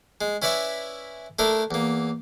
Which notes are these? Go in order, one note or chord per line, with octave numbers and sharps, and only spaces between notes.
G#3
C#4 E4 B4 D5 E5 C#6
A3 D4 E4 A4 A#4
E2 A#3